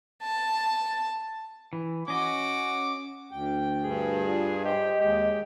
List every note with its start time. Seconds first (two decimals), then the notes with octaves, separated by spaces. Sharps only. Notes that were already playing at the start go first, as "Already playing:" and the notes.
0.23 A5
1.73 E3
2.08 C#4 F#4 D#5 D6
3.31 D2 G5
3.84 G2 G#4
4.26 D4 F4
4.65 G4 C5 D#5 G5
5.01 D#2 G#3 G4